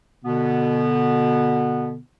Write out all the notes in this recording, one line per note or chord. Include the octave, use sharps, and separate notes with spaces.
B2 D3 B3